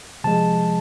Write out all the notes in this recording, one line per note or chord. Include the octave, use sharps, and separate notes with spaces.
C3 F3 G#3 A5